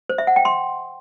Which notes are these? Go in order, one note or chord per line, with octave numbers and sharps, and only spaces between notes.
C5
E5
F#5
G5
C6